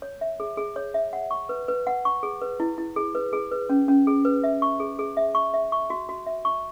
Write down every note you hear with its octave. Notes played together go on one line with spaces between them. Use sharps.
C#5
E5
G#4
G#4
C#5
E5
F#5
C#6
B4
B4
F#5
C#6
G#4
B4
E4
E4
G#4
B4
G#4
B4
C#4
C#4
G#4
B4
E5
C#6
G#4
G#4
E5
C#6
E5
C#6
F#4
F#4
E5
C#6